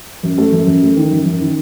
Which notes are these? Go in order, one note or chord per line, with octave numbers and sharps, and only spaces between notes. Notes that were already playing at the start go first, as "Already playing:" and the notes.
F#2
A3
F#2
F#2
A3
D#3
F#2
F#2
D#3